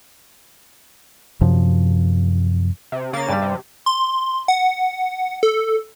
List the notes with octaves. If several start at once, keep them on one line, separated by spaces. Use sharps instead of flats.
F#2 C3 F3
C3
C#3 A#3 A6
G2 G3
C3
C6
F#5
A4